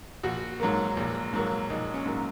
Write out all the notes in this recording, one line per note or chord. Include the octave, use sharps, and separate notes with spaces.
A#1 F#4
G#2 F#3 A#3
A#1
G#2 F#3 A#3
A#1 D#4
C#4
G#2 F#3 A#3